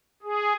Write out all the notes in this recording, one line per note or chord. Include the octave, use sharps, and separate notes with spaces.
G#4